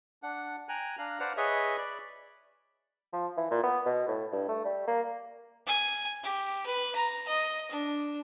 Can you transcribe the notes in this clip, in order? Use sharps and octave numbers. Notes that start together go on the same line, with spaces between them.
D4 F#5
G5 G#5 A#5 F#6
D4 F5 A#5 F#6
B4 C5 D5 F5 F#5
G#4 B4 C#5 D#5 E5
D5 B5
F3
E3
A#2
B3
B2
A2
G2
A3
G3
A#3
G#5
G4
B4
A#5
D#5
D4